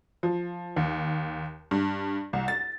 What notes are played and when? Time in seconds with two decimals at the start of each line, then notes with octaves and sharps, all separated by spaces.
0.23 F3
0.76 D#2
1.71 G2
2.33 C2
2.48 A6